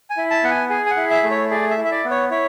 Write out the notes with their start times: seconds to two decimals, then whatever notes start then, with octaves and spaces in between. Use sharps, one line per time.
0.10 G#5
0.17 E4
0.30 A5
0.43 B3 F#5
0.51 G#5
0.70 G#4 G#5
0.86 G#5
0.91 F#5
0.97 E4
1.10 E5
1.23 A3
1.31 C#5
1.51 G#4 D5
1.70 E5
1.77 E4
1.84 E5
1.91 D5
2.05 B3
2.11 C#5
2.31 E4 C#5